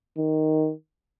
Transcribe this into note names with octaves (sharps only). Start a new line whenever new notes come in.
D#3